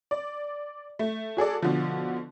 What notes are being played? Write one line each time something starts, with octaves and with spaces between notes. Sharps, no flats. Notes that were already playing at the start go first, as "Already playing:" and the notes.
D5
A3
F#4 G#4 A4 D5
B2 D3 F3